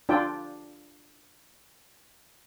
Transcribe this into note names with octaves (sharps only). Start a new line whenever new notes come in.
D4 F4 D5 G5